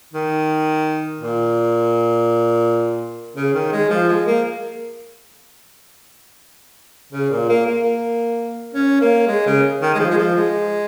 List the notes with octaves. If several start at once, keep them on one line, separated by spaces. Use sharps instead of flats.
D#3
A#2
C#3
D#3
G#3
F3
G#3
A#3
C#3
A#2
A#3
A#3
C#4
A#3
G#3
C#3
D#3
G#3
F3
G#3
F3
G#3